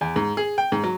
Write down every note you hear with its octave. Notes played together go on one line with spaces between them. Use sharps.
E2
G#2
G#4
G5
G#2
F#3